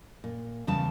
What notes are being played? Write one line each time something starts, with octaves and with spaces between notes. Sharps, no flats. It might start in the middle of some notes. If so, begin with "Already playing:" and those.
A#2
E2 C#3 G3 A5